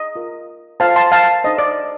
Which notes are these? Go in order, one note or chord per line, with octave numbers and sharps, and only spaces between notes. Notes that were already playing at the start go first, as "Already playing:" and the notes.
Already playing: D#5
F4 A#4
F4 A4 C5 F5 A5
A5 C6
F5 A5
D#4 A4 C5 D#5
D5